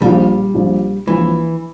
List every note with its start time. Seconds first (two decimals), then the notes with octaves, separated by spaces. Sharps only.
0.01 A#1 A#2 F3 G3
0.54 A#1 A#2 F3
1.07 A#1 A#2 E3 F3